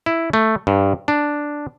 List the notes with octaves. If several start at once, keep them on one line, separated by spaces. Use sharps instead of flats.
E4
A3
G2
D4